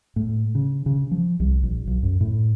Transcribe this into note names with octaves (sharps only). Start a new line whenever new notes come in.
A2
C#3
C#3
F3
C2
A#1
B1
F#2
A2